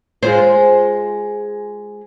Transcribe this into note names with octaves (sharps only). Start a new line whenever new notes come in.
G#3 F4 C5